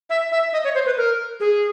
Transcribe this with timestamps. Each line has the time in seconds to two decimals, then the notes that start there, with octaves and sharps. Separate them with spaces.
0.10 E5
0.31 E5
0.53 D#5
0.64 C#5
0.74 C5
0.86 B4
0.97 A#4
1.40 G#4